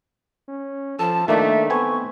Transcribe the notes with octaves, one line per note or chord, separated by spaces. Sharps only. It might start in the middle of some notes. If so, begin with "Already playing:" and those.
C#4
F3 A4 A5
D#3 A3 A#3 D4 E5
A3 B3 C4 G#5 C#6